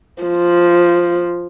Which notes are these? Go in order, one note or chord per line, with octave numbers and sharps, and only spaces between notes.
F3